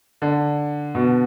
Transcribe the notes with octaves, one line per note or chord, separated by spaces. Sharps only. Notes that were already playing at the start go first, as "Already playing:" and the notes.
D3
B2